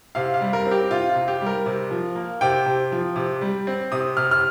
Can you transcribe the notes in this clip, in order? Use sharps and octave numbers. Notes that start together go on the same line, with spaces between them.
C3 F5
F5
G3
A#4
C4
G4
C3 F4
F4
C3
G4
G3
A#4
C3
F3
A#3
C3 G5
C3
F3
C3
G3
C4
C3 D#6
C3 F6
F6